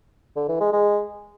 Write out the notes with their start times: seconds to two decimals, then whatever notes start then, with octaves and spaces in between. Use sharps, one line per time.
0.36 D3
0.49 E3
0.60 G#3
0.73 G#3